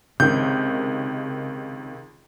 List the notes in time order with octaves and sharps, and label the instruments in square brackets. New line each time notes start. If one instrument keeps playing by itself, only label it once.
[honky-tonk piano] C#2 D#3 [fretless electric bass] C3 [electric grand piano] G6